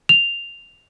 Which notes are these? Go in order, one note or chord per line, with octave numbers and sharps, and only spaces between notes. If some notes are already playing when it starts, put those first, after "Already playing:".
F7